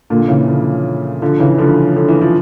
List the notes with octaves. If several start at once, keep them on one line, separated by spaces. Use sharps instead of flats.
A#2 D3
C#3 E3
D3 F3
D3 F3
C#3 E3
D3 F3
D3
E3
F3